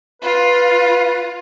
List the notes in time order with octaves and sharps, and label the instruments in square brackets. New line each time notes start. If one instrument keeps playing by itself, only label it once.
[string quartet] F4 [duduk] B4